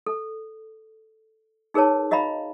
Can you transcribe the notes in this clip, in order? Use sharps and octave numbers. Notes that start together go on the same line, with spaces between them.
A4
D#4 G#4 A#4 B4 C#5 A5
F#4 D#5 F5 A#5 B5